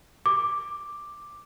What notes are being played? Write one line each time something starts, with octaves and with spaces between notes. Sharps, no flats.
D6